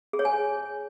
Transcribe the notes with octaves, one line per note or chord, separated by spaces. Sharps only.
G#4
C#5
G#5